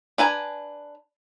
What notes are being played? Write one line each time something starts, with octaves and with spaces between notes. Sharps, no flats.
D4 B4 G#5 A#5